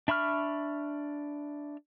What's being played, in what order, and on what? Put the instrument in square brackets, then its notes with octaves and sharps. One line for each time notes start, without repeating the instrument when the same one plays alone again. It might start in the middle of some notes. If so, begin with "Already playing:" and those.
[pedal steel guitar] D4 E5 B5 C#6 F6